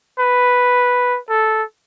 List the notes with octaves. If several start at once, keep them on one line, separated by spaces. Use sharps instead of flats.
B4
A4